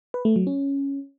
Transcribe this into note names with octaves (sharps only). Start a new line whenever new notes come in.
B4
A3
F#3
C#4